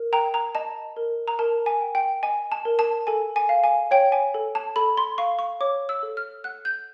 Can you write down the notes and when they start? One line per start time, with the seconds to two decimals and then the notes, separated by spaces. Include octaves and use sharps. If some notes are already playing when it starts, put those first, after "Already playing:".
Already playing: A#4
0.13 G5 A#5
0.34 A#5
0.55 D#5 A5
0.97 A#4
1.28 A#5
1.39 A#4 A5
1.66 G#5
1.81 G5
1.95 G5
2.23 D#5 G#5
2.52 A5
2.65 A#4
2.79 A5
3.07 A4 G#5
3.36 G#5
3.49 F5
3.64 G#5
3.91 C#5 G5
4.12 G#5
4.34 A4
4.55 A5
4.76 A4 B5
4.97 C6
5.18 F5 C#6
5.39 C#6
5.61 C#5 D6
5.89 E6
6.03 A4
6.17 F6
6.44 F#5 F#6
6.65 G6